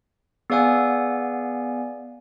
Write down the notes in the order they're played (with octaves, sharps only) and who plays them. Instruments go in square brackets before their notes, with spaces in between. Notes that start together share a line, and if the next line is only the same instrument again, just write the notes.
[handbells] B3 G#4 D5 F5 F#5 G#5